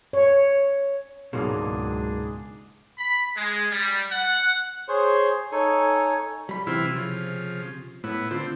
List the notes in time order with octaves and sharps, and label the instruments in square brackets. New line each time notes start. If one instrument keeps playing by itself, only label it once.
[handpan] C#5
[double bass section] C#2 [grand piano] G#2 [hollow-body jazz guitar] B2 F#3 A#3 [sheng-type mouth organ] D4 G#4
[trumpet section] B5
G#3
G3
F#5
[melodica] G#4 C5 C#5 C6
D#4 A4 C#5 G#5
[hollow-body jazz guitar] G3 B5
[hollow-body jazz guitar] C3 C4 C6 [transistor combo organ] E3 E4 F4
[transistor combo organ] C#3 F3
[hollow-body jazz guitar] A2 [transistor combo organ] B3 E4
[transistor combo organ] D3 C4 [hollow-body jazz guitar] F4